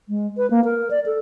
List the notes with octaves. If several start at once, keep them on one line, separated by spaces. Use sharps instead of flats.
G#3
B4
A#3
A#4
D5
A4